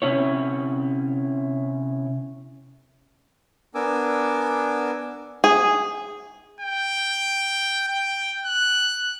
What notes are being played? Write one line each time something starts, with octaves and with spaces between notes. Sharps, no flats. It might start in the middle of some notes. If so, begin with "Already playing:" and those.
C3 C#4 E4 C#5
B3 D4 A#4 G#5 D6 E6
G#4
G5
G5
F#6